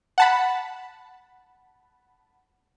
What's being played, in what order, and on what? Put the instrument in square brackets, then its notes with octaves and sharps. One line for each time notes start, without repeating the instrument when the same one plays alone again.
[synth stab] F#5 A5 B5